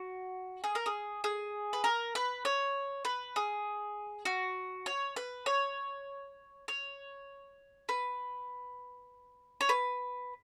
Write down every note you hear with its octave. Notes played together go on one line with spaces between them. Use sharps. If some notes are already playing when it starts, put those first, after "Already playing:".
Already playing: F#4
G#4
A#4
G#4
G#4
B4
A#4
B4
C#5
B4
G#4
F#4
C#5
B4
C#5
C#5
B4
C#5
B4